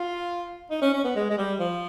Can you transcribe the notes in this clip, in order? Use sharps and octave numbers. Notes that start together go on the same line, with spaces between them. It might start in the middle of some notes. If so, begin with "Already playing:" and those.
Already playing: F4
D#4
C#4
C#4
B3
G#3
G#3
G3
F3